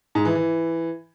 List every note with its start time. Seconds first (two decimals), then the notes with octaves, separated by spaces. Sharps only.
0.15 G#2
0.25 E3
0.35 E3